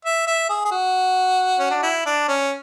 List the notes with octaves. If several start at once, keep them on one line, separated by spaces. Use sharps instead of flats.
E5
E5
G#4
G#4
F#4
C#4
D4
E4
D4
C#4